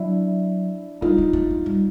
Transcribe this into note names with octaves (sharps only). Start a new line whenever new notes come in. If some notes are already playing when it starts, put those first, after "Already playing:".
Already playing: F#3 D4 E4
G3 D#4 F4
G#3
A3
G#3
G3